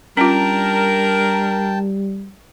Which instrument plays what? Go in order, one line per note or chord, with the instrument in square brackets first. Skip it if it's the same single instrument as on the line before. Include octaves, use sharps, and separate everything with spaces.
[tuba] G3 [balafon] C#4 F4 [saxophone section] D4 A#4 [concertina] G5 A5